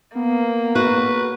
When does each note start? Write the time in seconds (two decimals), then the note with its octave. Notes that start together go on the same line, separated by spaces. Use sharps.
0.15 A#3 B3
0.75 F#4 B4